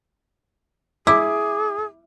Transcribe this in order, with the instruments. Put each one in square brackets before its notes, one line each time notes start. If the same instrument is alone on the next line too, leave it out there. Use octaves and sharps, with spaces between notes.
[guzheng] E4 [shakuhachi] G#4 [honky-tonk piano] D6